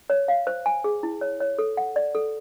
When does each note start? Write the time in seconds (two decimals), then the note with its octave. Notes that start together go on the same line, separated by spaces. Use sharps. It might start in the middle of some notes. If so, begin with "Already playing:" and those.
0.10 C#5
0.28 F5
0.47 C5
0.66 G#5
0.84 G#4
1.03 E4
1.21 C#5
1.40 C#5
1.59 A4
1.77 F#5
1.96 D5
2.15 A4